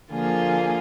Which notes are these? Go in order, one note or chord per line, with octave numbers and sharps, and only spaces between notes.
D3 F3 A#3 F4 G#4